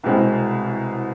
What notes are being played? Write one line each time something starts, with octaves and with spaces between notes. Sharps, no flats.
C2 B2 G#3 C4 E4